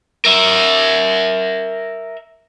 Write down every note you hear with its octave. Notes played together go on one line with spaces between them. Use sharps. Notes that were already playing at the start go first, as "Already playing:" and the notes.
A#4 E5